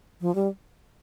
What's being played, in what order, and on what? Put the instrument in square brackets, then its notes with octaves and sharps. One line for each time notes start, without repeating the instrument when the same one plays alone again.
[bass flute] F3
G3